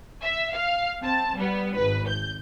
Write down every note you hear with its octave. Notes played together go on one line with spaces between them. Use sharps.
E5
F5
C4 A5
G3 B3
G#1 B4
G6